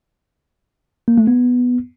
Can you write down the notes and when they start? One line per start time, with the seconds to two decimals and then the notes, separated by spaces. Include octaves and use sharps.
1.08 A#3
1.18 A3
1.27 B3